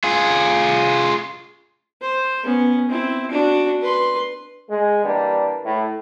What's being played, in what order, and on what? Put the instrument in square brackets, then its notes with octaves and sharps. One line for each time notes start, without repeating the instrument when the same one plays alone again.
[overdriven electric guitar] F4 G#4
[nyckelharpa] C5
B3 C#4
C4 E4
D4 F#4
B4 C6
[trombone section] G#3
E3 G3 A#3 D4
A2 E4